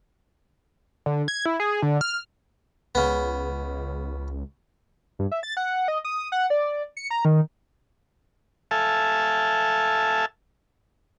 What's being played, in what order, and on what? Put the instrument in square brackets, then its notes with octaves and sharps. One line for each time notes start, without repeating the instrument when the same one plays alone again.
[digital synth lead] D3
G#6
E4
G#4
D3
F6
[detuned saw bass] C#2 [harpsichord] C#3 B3
[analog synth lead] G2
E5
A6
F#5
D#5
D#6
F#5
D5
C#7
A#5
D#3
[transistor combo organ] A4 E5 F5 G#5 A5